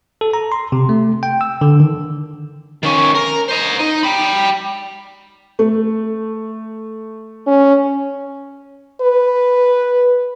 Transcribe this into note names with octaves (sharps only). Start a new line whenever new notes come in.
A4
A#5
C6
C3
A3
G5
E6
D3
D#3
D#3 C#4
A#4
C5 D#5
D#4
G5 B5
A3
C#4
B4